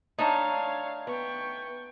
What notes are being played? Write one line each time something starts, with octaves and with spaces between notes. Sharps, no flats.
A3 D4 D#4 C#5 F5 A5 A#5
B3 G5 C#6